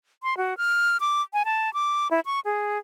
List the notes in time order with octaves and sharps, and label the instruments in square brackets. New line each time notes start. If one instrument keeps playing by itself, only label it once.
[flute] C6
F#4
F6
D6
G#5
A5
D6
E4
C#6
G#4